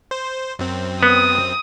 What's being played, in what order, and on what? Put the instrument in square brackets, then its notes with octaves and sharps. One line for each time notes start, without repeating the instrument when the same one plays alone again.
[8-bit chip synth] C5
F#2 C4
[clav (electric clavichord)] B3 [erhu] D#6